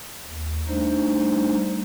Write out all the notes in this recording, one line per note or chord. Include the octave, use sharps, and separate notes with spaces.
D#2
G3 A3 D4 D#4 C5